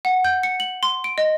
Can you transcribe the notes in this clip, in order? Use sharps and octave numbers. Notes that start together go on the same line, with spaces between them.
F#5
G6
C#7
F#7
C6
D7
D#5